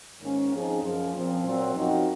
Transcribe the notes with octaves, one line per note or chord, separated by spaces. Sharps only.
G#2 D#3 A#3 C#4
F3 C4 D#4 G#4
F#2 C#3 F3
A#2 F3 C4
A#2 F#3 C4
F#2 F3 C4 D#4 F#4